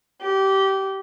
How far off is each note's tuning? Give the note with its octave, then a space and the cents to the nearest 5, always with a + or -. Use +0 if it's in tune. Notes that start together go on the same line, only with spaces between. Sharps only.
G4 -20